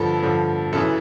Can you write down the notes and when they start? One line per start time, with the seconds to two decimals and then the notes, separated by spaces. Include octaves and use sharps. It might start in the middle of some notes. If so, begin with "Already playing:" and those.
Already playing: G2 D3 F3 A4
0.23 G2 D3 F3
0.73 F#2 C#3 E3 A4